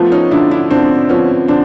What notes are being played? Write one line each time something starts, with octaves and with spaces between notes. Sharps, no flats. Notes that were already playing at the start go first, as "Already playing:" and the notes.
Already playing: F3 A3 B3
C#4 D#4
D3 D4 E4
D4 E4
D3 C4 D4
F3 B3 C#4
D3 C4 D4